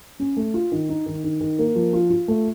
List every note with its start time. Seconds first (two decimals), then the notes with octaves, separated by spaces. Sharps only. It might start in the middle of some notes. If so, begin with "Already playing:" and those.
0.20 C#4
0.37 A3
0.54 F4
0.72 D#3
0.89 D#4
1.06 D#3
1.24 D#3
1.41 D#3
1.59 A#3
1.76 F3
1.93 F4
2.10 F4
2.28 A3